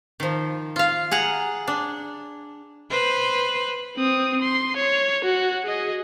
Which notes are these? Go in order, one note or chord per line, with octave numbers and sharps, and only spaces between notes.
D#3 F3
F4 F5
G#4 F#5 A#5
D4
B4 C5
C4 D#6
C6
C#5
F#4
G#4 D#5